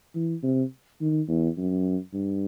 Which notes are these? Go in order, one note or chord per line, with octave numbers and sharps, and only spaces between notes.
E3
C3
D#3
E2
F#2
G2